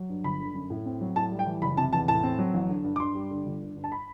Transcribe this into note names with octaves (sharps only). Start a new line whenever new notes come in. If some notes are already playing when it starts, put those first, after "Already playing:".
Already playing: F#3
G2
G1 B5
D3
F#2
A2
C4
F#3
A2 A5
G3
G5
E3
F#1 B5
C3 A5
E2 A5
A2 A5
C4
F#3
A1
D3
G2
D6
G2 C6
G3
D3
G1
D3
G2
A5
B5